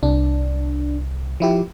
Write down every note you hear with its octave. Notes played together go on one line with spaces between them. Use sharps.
C2 D4
F3 E4 G4